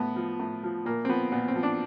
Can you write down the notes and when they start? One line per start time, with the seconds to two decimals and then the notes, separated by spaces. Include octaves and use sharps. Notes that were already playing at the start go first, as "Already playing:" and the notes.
Already playing: A2 B3
0.16 F3
0.40 A2
0.63 F3
0.85 A#2 A#3
1.05 C4
1.09 F3 B3
1.32 A#2 B3
1.48 C4
1.55 F3
1.63 D4